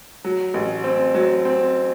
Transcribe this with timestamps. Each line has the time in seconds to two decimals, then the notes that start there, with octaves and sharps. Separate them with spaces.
0.24 F#3
0.54 A1
0.84 C4
1.15 F#3
1.45 C4